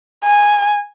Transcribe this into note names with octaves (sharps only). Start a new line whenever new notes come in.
G#5